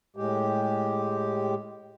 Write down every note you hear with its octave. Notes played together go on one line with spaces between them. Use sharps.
A2 G#3 G4